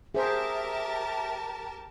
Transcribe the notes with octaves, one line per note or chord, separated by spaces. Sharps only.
G4 G#4 A#4 C5 E5 A5